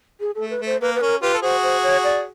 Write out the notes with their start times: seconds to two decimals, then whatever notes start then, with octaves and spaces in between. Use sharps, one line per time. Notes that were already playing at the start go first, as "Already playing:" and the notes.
0.20 G#4
0.35 A4
0.40 A3
0.50 B4
0.61 A3
0.66 C5
0.81 A#3 B4
0.95 B4
1.01 C#4 A#4
1.22 F4 G4 B4
1.34 A4
1.42 F#4 G#4 C5
1.63 C5
1.83 C#5
2.04 D5